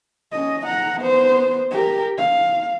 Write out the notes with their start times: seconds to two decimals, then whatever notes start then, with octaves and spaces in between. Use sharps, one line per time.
0.32 C#4 D#5
0.66 F#5 A#5
1.01 B3 C5
1.71 G4 A#4
2.18 F5